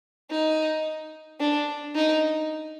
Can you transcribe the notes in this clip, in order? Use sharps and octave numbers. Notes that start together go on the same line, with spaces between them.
D#4
D4
D#4